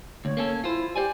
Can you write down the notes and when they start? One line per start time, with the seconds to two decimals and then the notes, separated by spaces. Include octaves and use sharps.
0.25 D2 C#5
0.37 A#3 C#4 A4
0.64 E4 F4 C5
0.96 G4 C5 D5 G#5